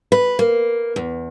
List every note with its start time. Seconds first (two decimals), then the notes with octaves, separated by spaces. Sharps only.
0.12 B4
0.39 A#3
0.96 E2